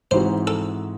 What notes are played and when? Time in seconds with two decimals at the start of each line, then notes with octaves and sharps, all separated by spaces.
0.11 G#2 E3 C4 D#4 F#4 C5
0.47 A4